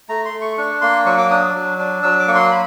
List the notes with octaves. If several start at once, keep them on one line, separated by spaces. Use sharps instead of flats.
A3 A#5
C6
A3
C#6
D4 C#6
A#3 C6
F#3 C#6
D6
D4 D#6
F#3
D4
F#3 E6
D6
A#3 C#6
C6
B5